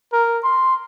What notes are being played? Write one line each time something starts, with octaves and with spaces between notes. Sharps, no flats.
A#4
C6